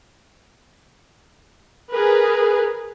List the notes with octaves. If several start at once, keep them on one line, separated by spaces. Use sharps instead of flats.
G#4 A#4 B4